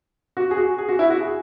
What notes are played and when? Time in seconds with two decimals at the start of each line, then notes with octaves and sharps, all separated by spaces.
0.37 F#4
0.51 G#4
0.57 F#4
0.78 G#4
0.89 F#4
0.99 E4
1.10 F#4
1.20 G#4